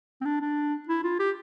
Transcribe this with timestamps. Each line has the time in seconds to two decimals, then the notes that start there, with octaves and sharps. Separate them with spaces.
0.21 C4
0.25 D4
0.41 D4
0.89 E4
1.04 F4
1.19 G4